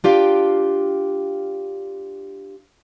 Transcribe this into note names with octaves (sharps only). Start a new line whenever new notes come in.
D4 F4 G4 F5 G5